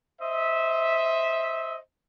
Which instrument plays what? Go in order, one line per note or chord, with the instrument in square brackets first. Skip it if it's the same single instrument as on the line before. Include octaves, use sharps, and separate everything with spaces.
[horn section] C5 D#5 E5